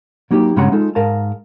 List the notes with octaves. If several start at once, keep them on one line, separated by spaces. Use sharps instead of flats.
F#3 A#3 D#4 F4 G4
G2 C#3 G#3 C#5 F#5 A#5
G#3 D#4 F4 A4
G#2 A#4 F5 A5